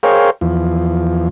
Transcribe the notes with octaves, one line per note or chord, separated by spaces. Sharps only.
G#4 A#4 C5 C#5 F5 G5
E2 F3